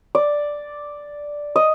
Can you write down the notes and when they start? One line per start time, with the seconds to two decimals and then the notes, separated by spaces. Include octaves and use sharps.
0.15 D5
1.56 D#5